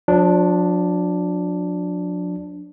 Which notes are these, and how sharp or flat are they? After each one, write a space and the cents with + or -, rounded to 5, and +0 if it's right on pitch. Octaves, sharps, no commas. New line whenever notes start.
F3 +45 D4 +0